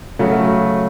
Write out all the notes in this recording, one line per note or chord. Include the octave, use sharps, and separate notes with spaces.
C#3 F#3 A3